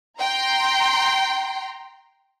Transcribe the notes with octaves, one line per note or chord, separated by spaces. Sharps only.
G5 A#5 C6